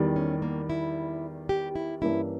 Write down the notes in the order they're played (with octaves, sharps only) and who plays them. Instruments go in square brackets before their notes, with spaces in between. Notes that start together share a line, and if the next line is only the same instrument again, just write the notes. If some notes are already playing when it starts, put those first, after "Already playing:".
Already playing: [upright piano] E2 D#3 G3
[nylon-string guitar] C#4
A#3
E4
G4
E4
[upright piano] G2 E3 A#3 C#4 G4 [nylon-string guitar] E4